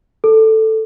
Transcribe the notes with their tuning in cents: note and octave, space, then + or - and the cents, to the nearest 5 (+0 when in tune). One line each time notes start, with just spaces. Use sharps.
A4 +5